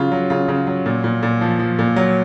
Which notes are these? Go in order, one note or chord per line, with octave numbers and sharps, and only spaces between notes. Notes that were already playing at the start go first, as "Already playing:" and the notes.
Already playing: C#3 F#3 F4
F#3
C#3 F4
C#3
F#3
A#2
A#2
A#2
F3
F3
A#2
F#3